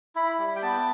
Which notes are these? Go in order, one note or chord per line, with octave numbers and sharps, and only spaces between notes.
E4 B5
G3
G5
B3 A5